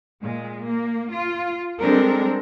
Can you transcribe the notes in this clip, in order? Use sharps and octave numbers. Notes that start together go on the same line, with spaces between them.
A#2 G#3
A#3
F4
G3 G#3 C4 D4 A4 A#4